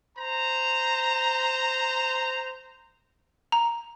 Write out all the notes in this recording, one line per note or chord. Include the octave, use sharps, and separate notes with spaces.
C5 A#5
A#5